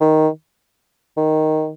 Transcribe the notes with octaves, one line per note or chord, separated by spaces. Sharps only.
D#3
D#3